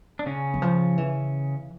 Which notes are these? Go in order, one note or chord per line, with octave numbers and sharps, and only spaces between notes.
D4
C#3 C#4
E3
F3
E3